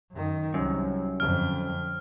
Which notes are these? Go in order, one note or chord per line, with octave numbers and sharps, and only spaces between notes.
F#2 D#3
C2 F#2
F2 D3 F6